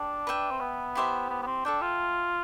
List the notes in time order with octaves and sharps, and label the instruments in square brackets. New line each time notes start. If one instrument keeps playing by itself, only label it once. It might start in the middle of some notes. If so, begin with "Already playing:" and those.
Already playing: [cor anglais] D4 [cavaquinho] A4 D5 G5
[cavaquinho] B4 E5 G5
[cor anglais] C4
B3
[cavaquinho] E4 G4 C5 E5
[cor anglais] B3
B3
C4
[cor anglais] D4 [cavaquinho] A4 E5 G5
[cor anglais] F4